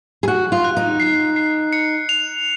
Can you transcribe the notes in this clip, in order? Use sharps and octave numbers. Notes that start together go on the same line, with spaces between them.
G#4
F#4 F#6
F4
F#6
D#4
C7
C7
C#7
F7